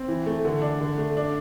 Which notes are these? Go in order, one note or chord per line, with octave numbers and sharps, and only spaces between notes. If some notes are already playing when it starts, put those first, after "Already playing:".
Already playing: C4
E3
A3
D3
D4
D3
A3
D4